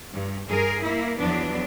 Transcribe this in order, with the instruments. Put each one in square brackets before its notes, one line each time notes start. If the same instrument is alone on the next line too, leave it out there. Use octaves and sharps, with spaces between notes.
[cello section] G2
G2 G#4 A#4
A#3 E4
E2 F3 F#3 B3 D4